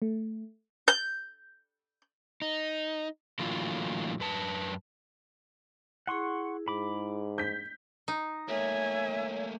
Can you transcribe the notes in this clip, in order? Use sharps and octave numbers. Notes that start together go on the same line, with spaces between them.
A3
G6
D#4
A2 D3 E3 F#3 A#3 F4
F#2 B4 A5
E4 G#4 F#5 C6 C#6
G#2 B5 D6
G6 B6
D#4
A3 A#3 C#5 E5 G#5